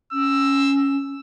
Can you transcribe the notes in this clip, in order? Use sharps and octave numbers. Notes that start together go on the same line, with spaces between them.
C#4 E6